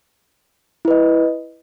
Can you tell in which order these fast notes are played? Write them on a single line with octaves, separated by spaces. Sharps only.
E4 B4 D#5